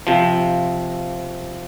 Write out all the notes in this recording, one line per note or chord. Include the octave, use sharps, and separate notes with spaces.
C3 F3